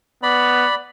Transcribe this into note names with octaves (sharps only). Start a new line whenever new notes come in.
B3 D5 B5